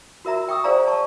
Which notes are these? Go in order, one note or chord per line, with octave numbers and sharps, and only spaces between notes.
F#4 A#4 E5 A#5
G5 C#6 D#6 E6
G#4 C5 D5 F5 G#5 A#5
A5 C#6